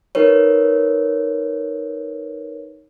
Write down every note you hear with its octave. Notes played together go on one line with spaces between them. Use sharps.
D#4 A#4 B4 C#5